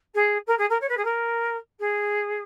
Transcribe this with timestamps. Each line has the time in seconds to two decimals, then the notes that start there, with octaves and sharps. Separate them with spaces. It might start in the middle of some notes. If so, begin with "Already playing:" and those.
0.14 G#4
0.47 A#4
0.58 G#4
0.69 A#4
0.80 C#5
0.89 B4
0.97 G#4
1.04 A#4
1.79 G#4